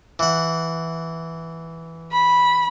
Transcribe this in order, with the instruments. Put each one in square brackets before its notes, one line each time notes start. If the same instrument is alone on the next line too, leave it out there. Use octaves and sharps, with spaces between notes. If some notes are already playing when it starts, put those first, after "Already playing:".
[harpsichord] E3 F#5
[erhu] B5